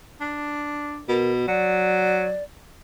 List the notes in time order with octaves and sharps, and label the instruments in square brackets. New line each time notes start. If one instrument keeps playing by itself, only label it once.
[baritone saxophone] D4
[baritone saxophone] B2 [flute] A#4
[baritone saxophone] F#3 [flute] D5